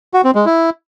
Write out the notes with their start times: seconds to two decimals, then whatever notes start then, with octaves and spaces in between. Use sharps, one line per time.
0.14 F#4
0.24 C4
0.35 G#3
0.46 E4